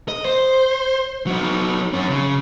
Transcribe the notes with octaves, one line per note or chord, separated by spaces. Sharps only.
D#5
C5
F#3 D#4
F#2 C#4
C#3